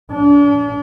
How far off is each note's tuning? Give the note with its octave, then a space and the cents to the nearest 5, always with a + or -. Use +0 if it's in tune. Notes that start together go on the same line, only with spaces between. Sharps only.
D4 -40